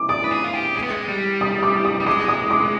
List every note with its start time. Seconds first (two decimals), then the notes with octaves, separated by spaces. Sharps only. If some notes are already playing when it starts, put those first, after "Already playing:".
Already playing: D6
0.09 D5 D#6
0.24 B4
0.31 G#4
0.44 F4
0.54 G4
0.75 G#3
0.82 B3
0.91 G#3
1.08 G3
1.41 D#6
1.63 D6
1.85 D#6
2.00 G3
2.06 G#3 D6
2.28 D#6
2.50 D6